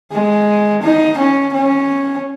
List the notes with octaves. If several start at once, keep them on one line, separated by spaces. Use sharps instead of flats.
G#3
D#4
C#4
C#4